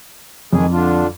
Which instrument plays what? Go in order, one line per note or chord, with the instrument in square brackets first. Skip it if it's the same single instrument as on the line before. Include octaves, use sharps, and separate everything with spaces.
[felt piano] F2 [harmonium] D#3 G#3 G#4
[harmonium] D3 D4 F4